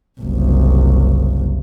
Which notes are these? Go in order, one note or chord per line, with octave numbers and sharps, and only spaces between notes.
F#1 C2